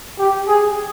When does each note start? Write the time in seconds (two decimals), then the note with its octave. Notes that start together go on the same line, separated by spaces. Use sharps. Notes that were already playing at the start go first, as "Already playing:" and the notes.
0.19 G4
0.47 G#4